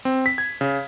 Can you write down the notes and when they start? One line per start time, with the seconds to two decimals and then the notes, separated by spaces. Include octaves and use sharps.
0.05 C4
0.26 B6
0.38 G#6
0.61 C#3